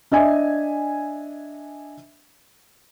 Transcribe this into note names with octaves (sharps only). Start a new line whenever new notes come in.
D4 D#5 E5 G#5